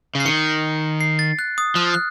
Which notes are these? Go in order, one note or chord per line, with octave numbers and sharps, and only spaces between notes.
C#3
C7
D#3 C#7
C7
A6
F#6
D#6
F3 F6
F#6